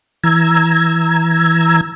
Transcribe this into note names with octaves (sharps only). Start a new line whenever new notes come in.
E3 A#5 E6 G#6